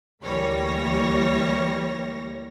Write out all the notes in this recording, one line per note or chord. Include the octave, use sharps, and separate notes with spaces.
D2 E3 G3 A#3 C#5 A#6